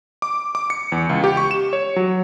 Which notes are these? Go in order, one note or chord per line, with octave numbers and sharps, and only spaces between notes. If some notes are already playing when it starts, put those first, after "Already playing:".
D6
D6
C#7
E2
C#2
G4
C#6
E7
C#5
F#3